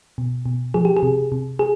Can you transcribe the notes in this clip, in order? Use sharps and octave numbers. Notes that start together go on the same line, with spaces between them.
B2
B2
F3 G#4
G4
G#4
C3
C3
G#4